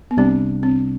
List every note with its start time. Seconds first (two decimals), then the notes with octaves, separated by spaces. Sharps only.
0.11 B3
0.17 C2 C3 G3 C4 D4
0.63 C4